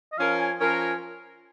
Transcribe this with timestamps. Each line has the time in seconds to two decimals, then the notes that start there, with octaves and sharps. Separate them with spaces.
0.12 D#5
0.18 F3 C#4 A#4 F5
0.38 G#5
0.59 F3 C#4 A#4 G#5
0.80 G#5